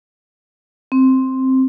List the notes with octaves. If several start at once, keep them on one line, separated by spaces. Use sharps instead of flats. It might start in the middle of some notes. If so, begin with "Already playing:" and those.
C4